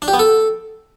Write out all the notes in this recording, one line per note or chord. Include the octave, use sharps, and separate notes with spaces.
D4
G4
B3
A4